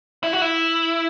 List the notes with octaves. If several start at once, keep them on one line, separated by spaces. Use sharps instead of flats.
E4
F#4
E4